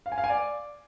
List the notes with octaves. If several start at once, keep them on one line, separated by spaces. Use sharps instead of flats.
F5
G#5
F5
G#5
D5